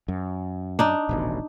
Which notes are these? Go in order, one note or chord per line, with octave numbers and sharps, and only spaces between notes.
F#2
D4 D#4
D#1 A1 B2